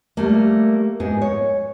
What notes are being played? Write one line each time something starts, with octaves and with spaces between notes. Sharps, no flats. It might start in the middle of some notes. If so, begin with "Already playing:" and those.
G3 A3 A#3
G#2 B3 G#4
C#5